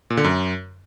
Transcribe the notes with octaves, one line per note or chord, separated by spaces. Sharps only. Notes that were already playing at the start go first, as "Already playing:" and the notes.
A#2
D3
F#2